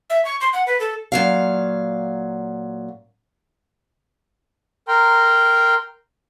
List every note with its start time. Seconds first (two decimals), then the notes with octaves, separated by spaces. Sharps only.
0.10 E5
0.25 C#6
0.41 C6
0.53 F#5
0.67 B4
0.80 A4
1.12 A#2 F#3 F5
4.88 A#4 G5 A#5 C6